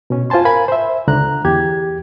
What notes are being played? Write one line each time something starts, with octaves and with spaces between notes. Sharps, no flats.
B2 C#4
F4 C5 G#5 A5 C6
A#4 F5 G#5 B5
C5 E5
C#2 D3 A#5 F#6
E2 G4 G#6